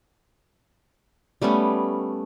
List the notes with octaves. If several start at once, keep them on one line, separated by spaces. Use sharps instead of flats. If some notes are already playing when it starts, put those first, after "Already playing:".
G3 A3 B3 C#4